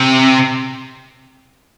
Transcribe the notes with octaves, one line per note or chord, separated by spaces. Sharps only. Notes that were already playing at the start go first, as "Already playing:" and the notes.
Already playing: C3